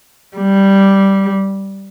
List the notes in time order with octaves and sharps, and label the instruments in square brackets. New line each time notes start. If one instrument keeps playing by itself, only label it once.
[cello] G3